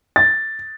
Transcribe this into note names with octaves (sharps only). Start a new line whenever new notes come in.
A6